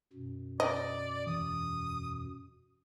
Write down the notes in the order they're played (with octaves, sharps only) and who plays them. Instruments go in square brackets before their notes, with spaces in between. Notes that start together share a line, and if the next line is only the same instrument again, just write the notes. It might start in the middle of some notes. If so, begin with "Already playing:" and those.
[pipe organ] F#2 B2
[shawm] D5 [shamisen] D#5
[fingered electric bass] E1 E3 [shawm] D#6